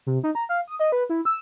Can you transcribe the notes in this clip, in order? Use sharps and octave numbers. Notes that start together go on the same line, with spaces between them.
C3
D#4
A#5
F5
D#6
D#5
B4
E4
E6